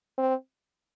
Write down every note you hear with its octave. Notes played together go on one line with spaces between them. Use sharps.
C4